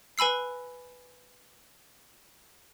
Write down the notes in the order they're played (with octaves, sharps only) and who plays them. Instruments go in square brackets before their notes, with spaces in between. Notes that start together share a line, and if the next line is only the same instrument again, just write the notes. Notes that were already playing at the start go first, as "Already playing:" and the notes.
[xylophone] B4 G#5 B5 E6 C7